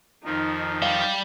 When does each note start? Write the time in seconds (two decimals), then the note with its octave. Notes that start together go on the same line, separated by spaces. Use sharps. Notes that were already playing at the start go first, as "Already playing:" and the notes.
0.25 F2 D#3 F3 D#4
0.82 G3 G4 F5